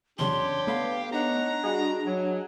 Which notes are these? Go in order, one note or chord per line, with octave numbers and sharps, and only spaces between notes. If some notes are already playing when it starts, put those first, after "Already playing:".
E2 C#3 F#3 D4 G4 C#5 C6
A3 B3 F5
D4 D#4 C#5 F#5 A#5
G3 F#4 G#4 D#5 F#5
F#3